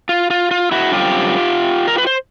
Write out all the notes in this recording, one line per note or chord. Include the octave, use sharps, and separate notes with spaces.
F4
F4
F4
E4 F#4
F#2 D3 G3 C4 F4 G4
A#4
B4
C5